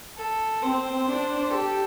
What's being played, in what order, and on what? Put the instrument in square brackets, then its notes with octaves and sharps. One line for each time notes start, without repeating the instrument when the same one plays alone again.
[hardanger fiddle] A4
[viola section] C4 [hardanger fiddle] C5
[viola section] D4
[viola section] G4 [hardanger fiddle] A4